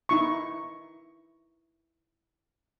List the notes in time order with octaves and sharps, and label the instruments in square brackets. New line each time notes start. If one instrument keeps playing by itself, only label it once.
[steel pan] D#4 E4 C#6